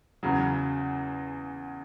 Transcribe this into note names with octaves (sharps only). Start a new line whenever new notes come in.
E2 C#3 F#3